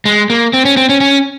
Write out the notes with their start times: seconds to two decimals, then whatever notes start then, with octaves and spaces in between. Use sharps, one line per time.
0.05 G#3
0.30 A#3
0.53 C4
0.65 C#4
0.77 C4
0.89 C#4
1.01 C#4